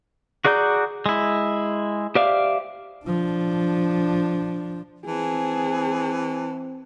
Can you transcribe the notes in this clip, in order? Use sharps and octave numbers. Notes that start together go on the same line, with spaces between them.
F#4 G#4 D5 A#5 G6
G#3 E4
G4 C5 D5 E5 F5
F3 D4
E3 C4 G#4 A5